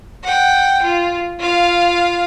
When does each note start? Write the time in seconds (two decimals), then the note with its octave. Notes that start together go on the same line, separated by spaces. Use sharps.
0.24 F#5 G5
0.82 F4
1.40 F4 F5